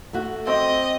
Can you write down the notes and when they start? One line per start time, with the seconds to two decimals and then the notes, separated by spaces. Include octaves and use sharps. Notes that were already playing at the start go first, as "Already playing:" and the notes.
0.13 A3 F#4
0.47 C4 D#5 D6